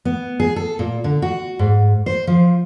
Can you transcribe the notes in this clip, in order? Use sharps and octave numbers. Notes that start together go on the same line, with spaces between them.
B3
G#4
A4
A#2
D3
F#4
G#2
C5
F3